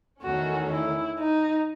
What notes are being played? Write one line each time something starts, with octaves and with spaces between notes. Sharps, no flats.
E2 D#3 A3 C#4 F#4
E4
D#4